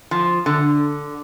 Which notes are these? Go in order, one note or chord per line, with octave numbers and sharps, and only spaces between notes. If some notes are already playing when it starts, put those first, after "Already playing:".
F3
D3